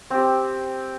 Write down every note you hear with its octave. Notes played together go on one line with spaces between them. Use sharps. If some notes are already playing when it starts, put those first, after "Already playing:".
C4 G4